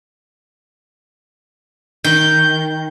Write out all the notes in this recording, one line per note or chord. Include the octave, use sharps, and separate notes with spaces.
D#3 G6